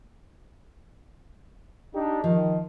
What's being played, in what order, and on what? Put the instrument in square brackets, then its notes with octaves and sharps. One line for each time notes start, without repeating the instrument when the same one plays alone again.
[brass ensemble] D4 D#4 G4
[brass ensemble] D#3 D#5 [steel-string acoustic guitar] F3